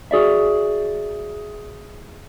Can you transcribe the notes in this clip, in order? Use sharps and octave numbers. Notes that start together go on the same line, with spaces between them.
F#4 G#4 D5 E5